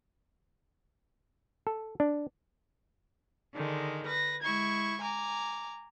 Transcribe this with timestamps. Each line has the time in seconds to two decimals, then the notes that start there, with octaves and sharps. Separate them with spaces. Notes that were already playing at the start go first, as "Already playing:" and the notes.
1.67 A4
2.00 D4
3.54 D3 D#3 G#3
4.06 B4 A#6
4.42 G#3 E4 C#6 G#6
5.01 G#5 A#5 D6